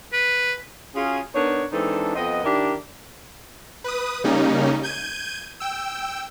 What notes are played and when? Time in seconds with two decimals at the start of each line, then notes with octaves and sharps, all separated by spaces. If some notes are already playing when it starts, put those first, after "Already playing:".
0.13 B4
0.95 C#4 F4 F#4 G#4
1.34 B3 D4 D#4 A#4 C#5
1.72 E3 G#3 C4 D4 D#4 A4
2.15 F2 B3 C4 D#5
2.43 D#3 D4 E4 G4 A#4 D5
3.84 B4 D#6
4.24 C#3 G3 A#3 C#4 D#4
4.83 G6 G#6 D#7
5.60 G5 E6